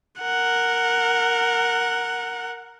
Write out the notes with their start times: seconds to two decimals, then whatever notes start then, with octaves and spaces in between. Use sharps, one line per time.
0.21 A#4 F#5